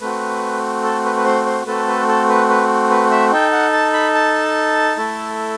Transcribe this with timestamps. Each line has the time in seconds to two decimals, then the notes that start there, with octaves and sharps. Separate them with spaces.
0.01 A3 C4 F#4 B4
0.83 A4
1.05 B4
1.16 B4
1.25 C5
1.46 C5
1.66 A3 C4 F#4 A4 B4
1.87 B4
2.08 A4
2.29 B4
2.50 B4
2.90 B4
3.11 E5
3.32 D#4 A4 G5
3.52 F#5
3.73 A5
3.93 B5
4.15 A5
4.97 A3 E4 A4